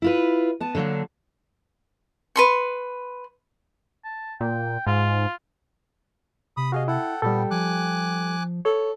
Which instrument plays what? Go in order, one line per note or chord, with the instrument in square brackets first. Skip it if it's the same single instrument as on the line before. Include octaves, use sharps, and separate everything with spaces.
[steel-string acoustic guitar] E4 F4 B4
B3 A5
D3 F#3 A#3 D4
[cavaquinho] B4 C6 C#6
[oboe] A5
[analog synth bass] A#2 [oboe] G5
[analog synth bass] G#2 [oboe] F4
[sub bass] C3 [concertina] B5 D#6
[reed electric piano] F#4 G#4 D#5 [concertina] F5
[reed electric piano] E4 [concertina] A4 F#5 [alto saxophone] G5
[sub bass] A#2 [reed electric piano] G3 G4 A4 [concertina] B3
[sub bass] F3 [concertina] G#5 D6 F#6
[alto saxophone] A4 [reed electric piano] C#5